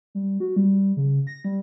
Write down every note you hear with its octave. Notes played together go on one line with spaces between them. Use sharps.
G3
F#4
G3
C#3
A#6
G3